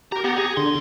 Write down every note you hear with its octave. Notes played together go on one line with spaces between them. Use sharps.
G4 A#4 A#5
B3 G4 F#5 A#5
G#4
E2 D3 C6